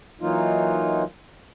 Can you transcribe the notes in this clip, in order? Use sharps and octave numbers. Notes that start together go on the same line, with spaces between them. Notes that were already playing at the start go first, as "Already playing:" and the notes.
E3 F#3 A#3 D#4 F4